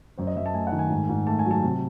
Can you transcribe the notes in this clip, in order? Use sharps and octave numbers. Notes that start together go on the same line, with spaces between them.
F#2 C5
D#5
F#2 E5
A5
A3 G#5
F#5
D#3
G#5
G#2
G#2
A3 A5
G#5
F#3
A5
C3